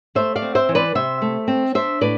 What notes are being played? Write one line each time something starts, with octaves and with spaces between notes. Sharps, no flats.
A3 C5 E5
D5 F5
C4
C5 E5
E3
B4 D5
C3 C5 E5
A3
C4
D4 C5 E5
A2 B4 D5